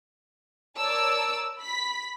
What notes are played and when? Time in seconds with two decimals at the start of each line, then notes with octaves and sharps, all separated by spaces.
0.77 A#4 C#5 D5 A5 E6
1.59 B5 B6